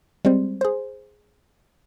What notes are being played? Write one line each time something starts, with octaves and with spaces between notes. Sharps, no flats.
G3 G#3 C4 C5
G#4 C5